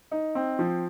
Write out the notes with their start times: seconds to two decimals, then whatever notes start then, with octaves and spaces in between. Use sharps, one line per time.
0.12 D#4
0.35 C4
0.59 F3